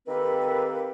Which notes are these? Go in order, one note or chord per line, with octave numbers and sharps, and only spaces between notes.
D#3 A#3 C4 G4 A4 B4